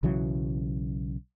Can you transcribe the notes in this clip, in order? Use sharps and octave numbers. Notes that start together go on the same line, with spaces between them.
B1 C#3 E3 F#3